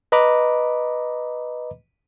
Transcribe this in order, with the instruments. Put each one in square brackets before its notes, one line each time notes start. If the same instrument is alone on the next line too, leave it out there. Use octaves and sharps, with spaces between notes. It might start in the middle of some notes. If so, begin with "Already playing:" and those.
[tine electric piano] B4 D#5 A#5 B5 D6